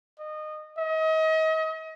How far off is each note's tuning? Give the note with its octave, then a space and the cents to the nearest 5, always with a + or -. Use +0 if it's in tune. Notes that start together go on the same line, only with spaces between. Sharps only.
D#5 -20
D#5 +35